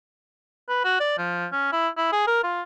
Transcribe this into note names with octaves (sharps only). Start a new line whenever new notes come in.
B4
F#4
D5
F3
C#4
E4
E4
G#4
A#4
F4